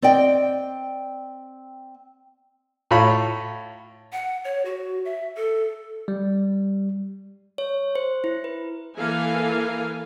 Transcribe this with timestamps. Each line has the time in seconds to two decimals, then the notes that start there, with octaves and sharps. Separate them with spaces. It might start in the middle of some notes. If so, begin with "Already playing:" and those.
0.02 C4 D5 D#5 G5
2.91 A2 F4 C#5 B5
4.13 F#5
4.44 C#5
4.65 F#4
5.05 E5
5.37 A4
6.08 G3
7.58 C#5
7.95 C5
8.24 E4
8.44 B4
8.97 E3 A#3 A4 F5 G#5